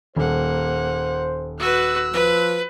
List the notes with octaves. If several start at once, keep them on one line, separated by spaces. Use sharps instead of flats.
D#1 A#3 C5 F#5
F#4 B4 E6 F#6
F3 B4